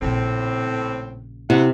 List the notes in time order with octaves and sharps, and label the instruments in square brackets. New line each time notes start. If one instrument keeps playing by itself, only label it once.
[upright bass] A#1 C#3 [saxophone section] A2 C4
[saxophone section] D2 A3 F#5 [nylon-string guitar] C3 [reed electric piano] E4